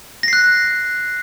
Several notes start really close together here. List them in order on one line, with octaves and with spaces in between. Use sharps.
A#6 C7 F#6